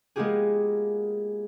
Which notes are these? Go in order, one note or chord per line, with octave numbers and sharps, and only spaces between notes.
G#3 A#3 B3 F4 G4 G#4